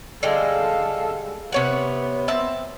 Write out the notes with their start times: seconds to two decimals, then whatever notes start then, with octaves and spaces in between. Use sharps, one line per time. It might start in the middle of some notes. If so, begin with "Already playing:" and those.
0.23 D3 G3 G#3 A4 F5
1.52 C3 B3 C#5 F#5
2.28 C4 E5 A5